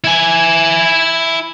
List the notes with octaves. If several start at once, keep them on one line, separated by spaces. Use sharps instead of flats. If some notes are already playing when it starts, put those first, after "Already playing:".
E4 G#5